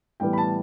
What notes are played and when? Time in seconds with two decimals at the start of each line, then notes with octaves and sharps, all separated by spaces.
0.20 A2 E3 G3 B3 G5
0.33 B5
0.38 A5